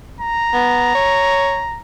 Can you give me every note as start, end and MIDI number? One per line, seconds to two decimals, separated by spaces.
0.21 1.81 82
0.53 0.92 59
0.95 1.63 73